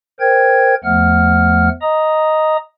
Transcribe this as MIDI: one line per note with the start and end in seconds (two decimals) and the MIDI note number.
0.20 0.75 70
0.20 0.75 72
0.20 0.75 79
0.20 0.75 92
0.84 1.69 40
0.84 1.69 53
0.84 1.69 57
0.84 1.69 78
0.84 1.69 89
1.82 2.57 75
1.82 2.57 82
1.82 2.57 87